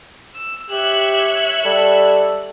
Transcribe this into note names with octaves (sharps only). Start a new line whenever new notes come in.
E6
G4 C#5 E5 F#6
G3 A4